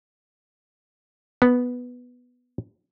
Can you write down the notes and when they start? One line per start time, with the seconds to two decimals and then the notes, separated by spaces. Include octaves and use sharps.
1.42 B3